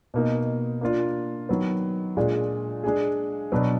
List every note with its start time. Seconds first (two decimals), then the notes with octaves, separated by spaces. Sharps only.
0.14 B2 A#3 D#4
0.81 A#3 D4 F4
1.49 D#3 F#3 B3
2.17 A#2 G#3 D4 F4 G#4
2.84 G#3 D4 G#4
3.52 B2 F#3 B3 D4